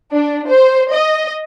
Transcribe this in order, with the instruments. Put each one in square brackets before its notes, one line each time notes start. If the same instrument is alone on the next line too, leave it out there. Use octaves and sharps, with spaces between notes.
[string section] D4
C5
D#5